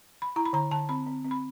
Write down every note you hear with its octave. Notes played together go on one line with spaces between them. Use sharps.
B5
E4 A#5
B5
D3 A#5
D3 A5
C4 B5
C4
C4
B5